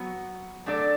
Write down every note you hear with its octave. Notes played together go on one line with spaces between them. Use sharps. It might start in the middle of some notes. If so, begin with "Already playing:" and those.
Already playing: F#3 B3 F#4
F#3 A3 D4 A4 D5